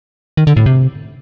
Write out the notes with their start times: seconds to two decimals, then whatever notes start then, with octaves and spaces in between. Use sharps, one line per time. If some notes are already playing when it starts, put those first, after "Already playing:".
0.37 D#3
0.47 D3
0.57 A2
0.66 C3